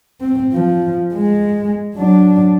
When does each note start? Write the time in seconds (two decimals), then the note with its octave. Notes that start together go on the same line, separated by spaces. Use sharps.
0.21 C4
0.53 F3
1.15 G#3
1.95 F#3 D4